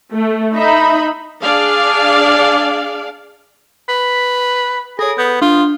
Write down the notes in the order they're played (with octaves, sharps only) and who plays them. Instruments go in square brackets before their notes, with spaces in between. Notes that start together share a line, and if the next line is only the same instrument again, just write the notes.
[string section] A3
D#4 E5 B5
[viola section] D4 G#4 D5 F5
[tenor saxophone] B4 [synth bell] B6
[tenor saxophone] G#4 [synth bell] A4 C#5
[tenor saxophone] B3 [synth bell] G6
[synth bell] D4 [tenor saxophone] F4